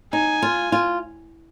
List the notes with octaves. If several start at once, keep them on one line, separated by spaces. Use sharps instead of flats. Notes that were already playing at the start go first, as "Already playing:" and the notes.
D#4 G#5
F4
F4